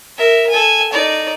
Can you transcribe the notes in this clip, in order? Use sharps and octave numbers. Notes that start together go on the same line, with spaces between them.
A#4 E5
A4 G#5
D#4 D5